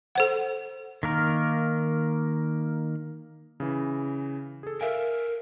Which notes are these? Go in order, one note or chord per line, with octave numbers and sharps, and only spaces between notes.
A4 C5 F#5
D#3 A#3 A#4
C#3 E3
G#4 A4
A#4 E5 F5 G#5